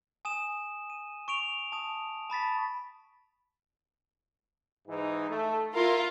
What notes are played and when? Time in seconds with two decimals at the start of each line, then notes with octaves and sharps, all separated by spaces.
0.25 G#5 D#6 E7
0.90 D#7
1.28 C#6 D7 F7
1.72 A5 D#6
2.30 A5 B5 A6 B6
4.88 G#2 E3 D#4
5.30 A3
5.74 E4 F4 A#4